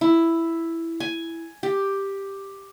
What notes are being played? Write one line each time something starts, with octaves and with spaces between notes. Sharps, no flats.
E4
G#5
G4